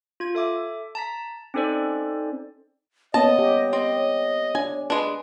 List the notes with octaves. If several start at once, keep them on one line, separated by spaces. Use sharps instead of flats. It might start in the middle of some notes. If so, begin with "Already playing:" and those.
F4 G#6
A4 E5 D6
A5 A#5 B6
C4 C#4 D#4 A4 C5 D5
A#3 B3 C#4 C#5 D#5 A5
G4
C4 D#5
D4 G#5
G#3 D4 B4